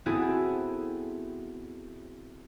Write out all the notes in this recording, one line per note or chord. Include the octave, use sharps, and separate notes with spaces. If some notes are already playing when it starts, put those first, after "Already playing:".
B3 C4 E4 F#4 G#4 A4